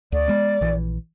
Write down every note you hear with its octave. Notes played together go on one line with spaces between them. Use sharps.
D2 D5
G#3 B3
A#1 E3